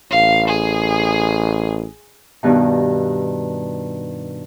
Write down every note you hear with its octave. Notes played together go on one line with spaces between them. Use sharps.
A1 F5
G#4
G2 B2 D#3